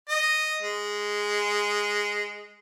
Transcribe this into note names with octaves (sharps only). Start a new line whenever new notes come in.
D#5
G#3